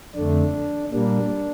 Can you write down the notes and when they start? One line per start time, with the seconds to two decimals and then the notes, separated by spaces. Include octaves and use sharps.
0.15 F2 D3 A3 D4
0.92 A#2 G3 A#3 D4